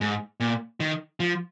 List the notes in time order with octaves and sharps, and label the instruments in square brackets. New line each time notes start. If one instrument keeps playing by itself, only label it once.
[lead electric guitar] G#2
A#2
D#3
F3